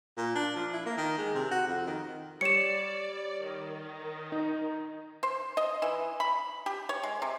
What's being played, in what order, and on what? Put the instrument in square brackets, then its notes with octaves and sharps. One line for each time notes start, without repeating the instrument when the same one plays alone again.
[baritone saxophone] A#2
D4
F3
E4
A#3
D#3
G#3
C3
F#4
F2
D#3
[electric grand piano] G3 C#5 [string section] D5 [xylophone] C#7 E7
[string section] D#3
[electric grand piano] D#4
[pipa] C5
D#5
E3
B5
G4
C#5
G#3
C3